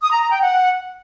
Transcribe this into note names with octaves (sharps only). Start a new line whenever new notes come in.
D#6
A#5
A#5
G5
F#5